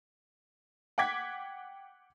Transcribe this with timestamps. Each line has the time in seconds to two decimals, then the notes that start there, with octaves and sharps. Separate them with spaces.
0.98 F#5 G5 D6 G#6 B6